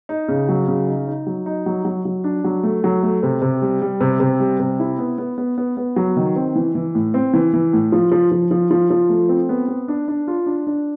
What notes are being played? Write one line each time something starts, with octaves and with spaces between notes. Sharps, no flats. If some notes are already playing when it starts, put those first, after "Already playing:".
D#4
C#3
F#3
C#3
D#4
D#4
F#3
D#4
F#3
F#3
F#3
D4
F#3
A3
F#3
A3
C3
C3
G3
G3
C3
C3
G3
C3
E4
B3
B3
B3
B3
B3
F#3
D#3
C4
E3
E3
A2
C4
E3
E3
A2
F3
F3
F3
F3
F3
F3
A3
C4
B3
B3
D4
D4
F4
D4
D4